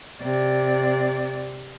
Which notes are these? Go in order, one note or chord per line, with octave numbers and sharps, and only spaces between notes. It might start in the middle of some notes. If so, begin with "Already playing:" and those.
C3 D5